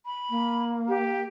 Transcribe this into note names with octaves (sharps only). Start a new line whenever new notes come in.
B5
A#3
G4